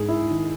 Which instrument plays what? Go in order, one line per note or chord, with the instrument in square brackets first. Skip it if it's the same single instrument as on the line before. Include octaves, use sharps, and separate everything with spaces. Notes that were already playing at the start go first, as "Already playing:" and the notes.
Already playing: [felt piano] G#2 G#4
E4
D#3